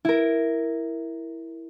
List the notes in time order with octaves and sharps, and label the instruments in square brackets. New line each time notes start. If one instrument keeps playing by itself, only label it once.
[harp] E4 A#4